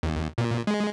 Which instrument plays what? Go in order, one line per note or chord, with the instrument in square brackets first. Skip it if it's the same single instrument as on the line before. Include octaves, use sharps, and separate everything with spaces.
[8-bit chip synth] D#2
A#2
G#3